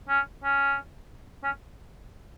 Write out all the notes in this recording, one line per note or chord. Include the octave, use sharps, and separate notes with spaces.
C#4
C#4
C#4